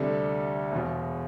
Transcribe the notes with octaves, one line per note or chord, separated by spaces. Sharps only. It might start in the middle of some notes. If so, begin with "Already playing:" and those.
Already playing: D2 C3 G3 D4 A4
E1 E2 B2